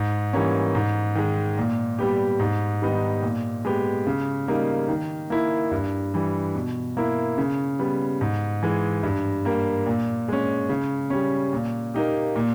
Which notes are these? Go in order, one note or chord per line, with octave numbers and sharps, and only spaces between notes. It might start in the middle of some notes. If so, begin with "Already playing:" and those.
Already playing: G#2
E3 G3 A#3 C#4
G#2
D#3 G#3
A#2
G3 B3 G4
G#2
D#3 G3 B3 D#4
A#2
G#3 B3 G4
C#3
G3 A#3 D#4
D#3
A#3 E4
G2
E3 G3
B2
A#3 E4
C#3
G3 B3
G#2
E3 G#3
G2
G3 A#3
A#2
G#3 C#4
C#3
G3 C#4
A#2
A#3 D#4 G4
A#2